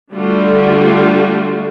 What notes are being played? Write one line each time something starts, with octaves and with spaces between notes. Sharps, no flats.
D3 G3 A3 F4 F#4